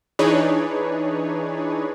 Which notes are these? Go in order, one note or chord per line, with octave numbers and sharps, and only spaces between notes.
E3 D4 D#4 G#4 B4 C#5